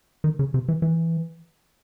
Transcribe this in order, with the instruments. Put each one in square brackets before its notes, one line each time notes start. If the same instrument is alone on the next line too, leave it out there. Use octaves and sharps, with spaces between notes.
[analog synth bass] D#3
C#3
C3
E3
E3